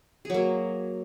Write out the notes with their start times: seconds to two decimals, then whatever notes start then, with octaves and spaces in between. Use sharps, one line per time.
0.25 G#4
0.30 F#3
0.34 A#3